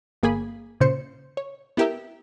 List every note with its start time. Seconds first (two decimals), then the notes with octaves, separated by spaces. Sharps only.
0.23 G1 A#3 G#4 G#5 B5
0.80 A#2 C#3 C5 C#7
1.37 C#5
1.77 B3 E4 G4 A#4 E5